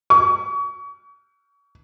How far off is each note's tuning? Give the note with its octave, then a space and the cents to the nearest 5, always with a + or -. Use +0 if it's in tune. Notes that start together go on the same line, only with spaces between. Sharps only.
C#6 +35